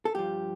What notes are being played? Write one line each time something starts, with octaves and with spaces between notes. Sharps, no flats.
A4
G2 F3 G4